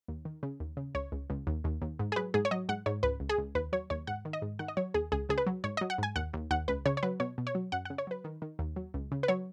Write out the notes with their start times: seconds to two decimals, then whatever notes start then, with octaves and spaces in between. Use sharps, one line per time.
0.08 D#2
0.25 D#3
0.43 C#3
0.60 D#2
0.77 C#3
0.95 C#2 C#5
1.12 C#2
1.30 C#2
1.47 D#2
1.64 D#2
1.82 D#2
1.99 G#2
2.12 G#4
2.16 F#3 B4
2.34 G#2 G#4
2.45 C#5
2.51 F#3 D#5
2.69 G#2 F#5
2.86 G#2 C#5
3.03 C#2 B4
3.20 C#2
3.29 G#4
3.38 C#2
3.55 D#2 B4
3.73 F#3 C#5
3.90 D#2 C#5
4.07 G#2 F#5
4.25 D#3
4.33 D#5
4.42 G#2
4.59 D#3 F#5
4.68 D#5
4.77 F#3 C#5
4.94 D#2 G#4
5.12 C#2 G#4
5.29 C#2 G#4
5.38 B4
5.47 F#3
5.64 G#2 C#5
5.77 D#5
5.81 F#3
5.90 F#5
5.98 G#2 G#5
6.16 D#2 F#5
6.33 D#2
6.51 D#2 F#5
6.68 C#2 B4
6.86 C#3 C#5
6.97 C#5
7.03 F#3 B4
7.20 B2 C#5
7.38 B2
7.47 C#5
7.55 F#3
7.72 F#2 F#5
7.85 F#5
7.90 C#3
7.98 C#5
8.07 F#3 B4
8.24 D#3
8.42 D#3
8.59 D#2
8.76 F#3
8.94 C#2
9.12 C#3
9.23 B4
9.28 F#3 C#5